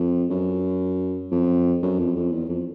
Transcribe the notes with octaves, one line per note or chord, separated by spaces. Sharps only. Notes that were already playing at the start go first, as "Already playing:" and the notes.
Already playing: F2
F#2
F2
F#2
F2
F2
E2
F2